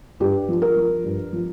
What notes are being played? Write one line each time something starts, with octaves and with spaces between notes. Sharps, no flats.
G2 G4
F3
A#4
F3
G2
F3